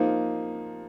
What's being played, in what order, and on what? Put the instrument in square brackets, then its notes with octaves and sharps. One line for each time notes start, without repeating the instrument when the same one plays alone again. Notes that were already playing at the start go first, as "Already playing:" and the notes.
Already playing: [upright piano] F3 A#3 D#4